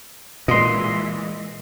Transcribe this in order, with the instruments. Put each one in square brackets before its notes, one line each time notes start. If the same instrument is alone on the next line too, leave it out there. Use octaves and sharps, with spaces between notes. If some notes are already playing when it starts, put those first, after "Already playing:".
[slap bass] A#2 [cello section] E3 G#3 [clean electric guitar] D#5 C6